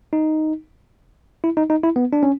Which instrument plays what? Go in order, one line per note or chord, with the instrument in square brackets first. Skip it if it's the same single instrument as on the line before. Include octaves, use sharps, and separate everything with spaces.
[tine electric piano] D#4
E4
D#4
D#4
E4
B3
D4
C#4